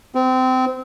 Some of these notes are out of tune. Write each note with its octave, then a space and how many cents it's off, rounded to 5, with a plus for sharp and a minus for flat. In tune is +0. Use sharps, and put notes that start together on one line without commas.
C4 -25